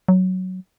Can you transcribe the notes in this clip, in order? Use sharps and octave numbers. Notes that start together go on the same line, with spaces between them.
F#3